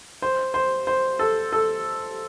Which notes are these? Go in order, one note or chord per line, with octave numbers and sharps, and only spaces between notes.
C5
C5
C5
A4
A4